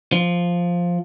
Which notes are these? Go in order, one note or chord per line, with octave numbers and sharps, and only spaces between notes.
F3